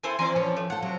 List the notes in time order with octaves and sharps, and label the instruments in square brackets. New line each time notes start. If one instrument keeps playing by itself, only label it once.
[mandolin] C4 C5 G#5 [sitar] E4 A4
[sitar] E3 C4 D5 [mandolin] G#5 A#5 C6
[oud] F3 C#4 B4 [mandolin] C#5
[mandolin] A3
[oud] F4 A4 [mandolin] F#5
[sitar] C3 [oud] F#3